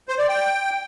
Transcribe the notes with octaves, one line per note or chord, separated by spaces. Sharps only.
C5
D5
G5